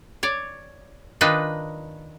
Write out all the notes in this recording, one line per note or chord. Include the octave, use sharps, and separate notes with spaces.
C#5 D5
D#3 D4 D#4 F4 B4